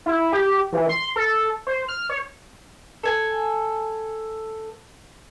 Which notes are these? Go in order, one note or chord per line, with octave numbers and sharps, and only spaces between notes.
E4
G4
E3
C6
A4
C5
F6
C#5
A4 G#5